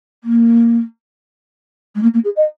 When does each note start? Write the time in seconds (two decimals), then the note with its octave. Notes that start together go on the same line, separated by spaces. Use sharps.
0.24 A#3
1.95 G#3
2.03 A#3
2.14 A#3
2.24 G#4
2.36 D#5